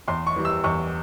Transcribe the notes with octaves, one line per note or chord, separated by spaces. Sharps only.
E2 C6
C#6
E3 G3
E6
E2 C#6